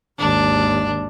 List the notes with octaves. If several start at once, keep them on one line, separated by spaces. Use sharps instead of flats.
G#1 D#2 D4